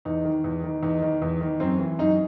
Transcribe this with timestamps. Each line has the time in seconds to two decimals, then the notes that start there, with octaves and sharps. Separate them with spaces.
0.05 E2 D#4
0.25 D#3
0.44 E2
0.64 D#3
0.83 E2 D#4
1.02 D#3
1.22 E2
1.41 D#3
1.60 F#2 C4
1.80 E3
1.99 F#2 D#4